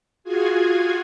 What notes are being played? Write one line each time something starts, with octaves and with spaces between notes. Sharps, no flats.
F4 F#4 G#4 G#5